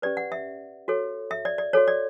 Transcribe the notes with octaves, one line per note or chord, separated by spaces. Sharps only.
C#4 G4 B4 D5
F#5
E5
F#4 A4 C#5
E5
D5
D5
F#4 A4 C#5
D5